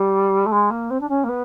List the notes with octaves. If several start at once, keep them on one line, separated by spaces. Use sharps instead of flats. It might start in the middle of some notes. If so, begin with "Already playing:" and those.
Already playing: G3
A3
G#3
A#3
C4
D4
C#4
A#3
B3